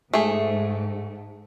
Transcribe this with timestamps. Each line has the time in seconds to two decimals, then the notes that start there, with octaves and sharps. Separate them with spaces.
0.14 G#2 A3 G#4